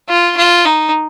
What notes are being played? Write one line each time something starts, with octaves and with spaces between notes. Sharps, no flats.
F4
F4
D#4